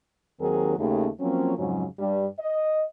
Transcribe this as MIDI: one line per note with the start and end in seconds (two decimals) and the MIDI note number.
0.40 0.75 39
0.40 0.75 51
0.40 0.75 54
0.40 0.75 60
0.40 0.75 68
0.40 0.75 70
0.77 1.08 39
0.77 1.08 49
0.77 1.08 57
1.20 1.53 53
1.20 1.53 54
1.20 1.53 58
1.20 1.53 60
1.20 1.53 61
1.57 1.85 41
1.57 1.85 44
1.57 1.85 49
1.57 1.85 54
1.99 2.26 43
1.99 2.26 55
2.39 2.83 75